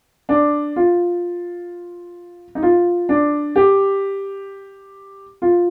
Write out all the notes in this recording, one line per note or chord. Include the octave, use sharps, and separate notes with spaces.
D4
F4
D#4
F4
D4
G4
F4